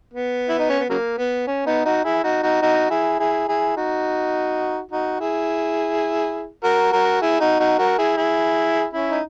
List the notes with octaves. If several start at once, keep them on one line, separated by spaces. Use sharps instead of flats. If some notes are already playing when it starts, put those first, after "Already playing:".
B3
E4
D#4
C#4
B3
C#3 F#3 A#3
B3
C#4
B3 D#4
D#4 F#4
E4 G#4
D#4 F#4
D#4 F#4
D#4 F#4
E4 G#4
E4 G#4
E4 G#4
D#4 F#4
D#4 F#4
E4 G#4
F#4 A#4
F#4 A#4
E4 G#4
D#4 F#4
D#4 F#4
F#4 A#4
E4 G#4
E4 G#4
C#4 E4
D#4